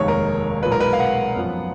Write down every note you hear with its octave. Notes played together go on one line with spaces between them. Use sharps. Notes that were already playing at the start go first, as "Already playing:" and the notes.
Already playing: F1 D#2 D#3 G#3 C#5
A#4
B1 A#2 G#3 B4
A#4
B4
F5
F#5
F#2 F3 B3